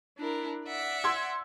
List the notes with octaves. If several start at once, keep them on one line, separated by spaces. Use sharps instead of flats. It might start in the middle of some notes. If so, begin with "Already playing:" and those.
D4 E4 A#4
D5 E5 F#5
C6 E6 G#6